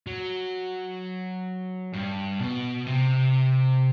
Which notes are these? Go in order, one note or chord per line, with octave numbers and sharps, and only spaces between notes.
F#3
G2
B2
C3